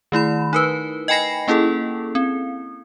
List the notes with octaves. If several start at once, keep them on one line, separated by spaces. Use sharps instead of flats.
D#3 A3 E4 B5
D#4 A#4 B4
D#5 G5 G#5 B5 A#6 C7
A#3 C#4 E4 G#4 A4
C4